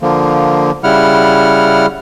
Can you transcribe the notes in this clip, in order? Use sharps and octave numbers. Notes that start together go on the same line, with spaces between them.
D3 F3 A#3
C#3 G3 E4 F#5 F6